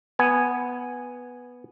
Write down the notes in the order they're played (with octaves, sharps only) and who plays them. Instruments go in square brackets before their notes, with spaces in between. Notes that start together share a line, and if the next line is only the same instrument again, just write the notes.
[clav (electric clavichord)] B3 G#5